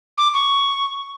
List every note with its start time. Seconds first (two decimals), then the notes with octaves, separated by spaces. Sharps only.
0.18 D6
0.34 C#6